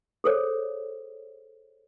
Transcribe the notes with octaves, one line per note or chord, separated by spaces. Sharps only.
G#4 A4 C5 C#5